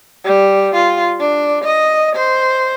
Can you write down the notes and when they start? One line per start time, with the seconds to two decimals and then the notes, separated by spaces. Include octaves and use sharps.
0.24 G3
0.75 F4
1.19 D4
1.64 D#5
2.15 C5